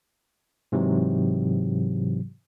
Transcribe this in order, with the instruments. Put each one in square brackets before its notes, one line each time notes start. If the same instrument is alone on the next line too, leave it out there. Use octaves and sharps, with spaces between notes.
[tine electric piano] G#2 C3 E3 F#3